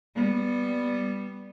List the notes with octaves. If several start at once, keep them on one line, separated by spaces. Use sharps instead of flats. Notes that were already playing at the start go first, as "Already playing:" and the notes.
G3 B3